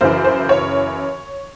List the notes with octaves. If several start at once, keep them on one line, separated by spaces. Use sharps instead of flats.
F#2 C#3 E3 C5
C5
C#5